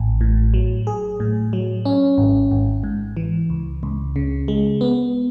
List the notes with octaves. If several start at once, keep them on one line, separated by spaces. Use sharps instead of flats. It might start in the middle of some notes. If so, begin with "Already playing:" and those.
Already playing: A1
A2
F#3
G#4
A2
F#3
C#4
G#1
G#1
G#2
E3
C#2
C#2
C#3
G#3
B3